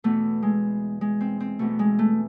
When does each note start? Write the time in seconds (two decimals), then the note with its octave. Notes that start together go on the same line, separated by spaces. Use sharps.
0.04 E2 B2 A3
0.42 G#3
1.01 G#3
1.21 C4
1.40 C4
1.59 E2 B2 A3
1.79 G#3
1.99 A3